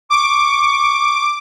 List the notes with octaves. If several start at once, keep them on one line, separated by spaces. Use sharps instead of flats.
C#6 D6